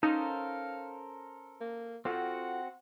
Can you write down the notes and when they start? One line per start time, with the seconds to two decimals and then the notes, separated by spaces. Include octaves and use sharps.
0.03 C#4 D#4 A4 A#4 C5 F5
1.61 A#3
2.05 C4 F4 F#4 A4 C5 F#5